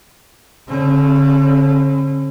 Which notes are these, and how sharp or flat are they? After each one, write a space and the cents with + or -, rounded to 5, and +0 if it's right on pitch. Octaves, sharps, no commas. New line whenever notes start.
D3 -35 C#4 -40